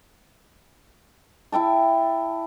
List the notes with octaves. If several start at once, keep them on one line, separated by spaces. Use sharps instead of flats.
E4 E5 G5 A5